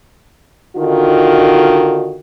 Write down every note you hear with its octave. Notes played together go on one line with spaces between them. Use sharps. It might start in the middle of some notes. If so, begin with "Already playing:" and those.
D3 D#3 D#4 F4 F#4